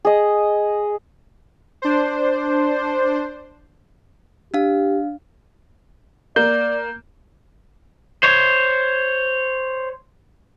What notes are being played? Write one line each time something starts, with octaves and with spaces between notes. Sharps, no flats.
G#4 D#5
D4 C5
D4 G4 F5
A#3 D5 G6
C5 C#5